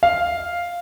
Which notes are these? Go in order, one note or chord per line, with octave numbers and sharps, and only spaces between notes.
F5